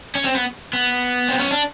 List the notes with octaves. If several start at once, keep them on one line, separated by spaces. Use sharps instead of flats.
C#4
C4
B3
B3
C4
C#4
D4